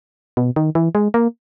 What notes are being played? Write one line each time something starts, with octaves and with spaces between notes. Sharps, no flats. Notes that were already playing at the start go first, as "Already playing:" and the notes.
B2
D#3
E3
G#3
A#3